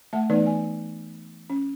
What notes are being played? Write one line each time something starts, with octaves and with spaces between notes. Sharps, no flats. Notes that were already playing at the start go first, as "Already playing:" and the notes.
A3 E5 F#5 A5
E3 A3 B3 D#4 B4 D5
G#5
C#4